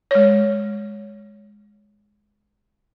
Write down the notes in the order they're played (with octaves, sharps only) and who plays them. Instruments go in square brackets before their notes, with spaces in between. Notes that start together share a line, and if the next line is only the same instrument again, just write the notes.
[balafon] G#3 C#5